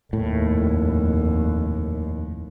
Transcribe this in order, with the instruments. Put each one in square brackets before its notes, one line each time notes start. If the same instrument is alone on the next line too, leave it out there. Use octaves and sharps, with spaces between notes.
[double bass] F1 D#2 [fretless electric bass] A2